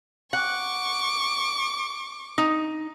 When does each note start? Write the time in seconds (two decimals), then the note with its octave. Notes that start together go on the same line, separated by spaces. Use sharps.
0.33 F#5 C#6 D6
2.38 D#4